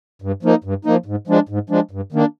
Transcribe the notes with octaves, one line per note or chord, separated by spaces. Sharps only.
G2
F3 A#3 D#4
G2
F3 A#3 D#4
G#2
F3 G#3 D4
G#2
F3 G#3 D4
G2
D#3 A#3 D4